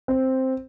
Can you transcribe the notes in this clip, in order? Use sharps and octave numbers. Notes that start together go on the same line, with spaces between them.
C4